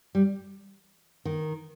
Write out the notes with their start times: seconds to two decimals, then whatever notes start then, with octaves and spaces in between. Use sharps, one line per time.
0.15 G3
1.25 D#3